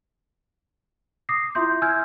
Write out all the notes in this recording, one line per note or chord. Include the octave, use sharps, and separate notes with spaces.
D6 D#6 A#6 C7
E4 F4 E5 C6 G6
G#5 E6 F6 G6 G#6